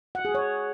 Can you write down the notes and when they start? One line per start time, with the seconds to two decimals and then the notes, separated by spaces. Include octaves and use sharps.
0.15 F#5
0.25 G#4
0.35 C#5